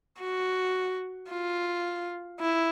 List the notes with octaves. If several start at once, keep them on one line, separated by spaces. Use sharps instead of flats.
F#4
F4
E4